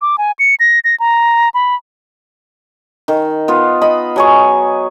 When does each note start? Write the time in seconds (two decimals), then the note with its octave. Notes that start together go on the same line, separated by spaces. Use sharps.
0.02 D6
0.18 G#5
0.39 C#7
0.60 A#6
0.84 A#6
1.00 A#5
1.54 B5
3.08 D#3
3.48 B3 F4
3.82 D#5 B5
4.16 F#3 G#4 C#6